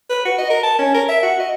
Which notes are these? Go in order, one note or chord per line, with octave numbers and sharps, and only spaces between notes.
B4
F#4
D#5
A#4
A5
C#4
A#4
E5
F#4
D#5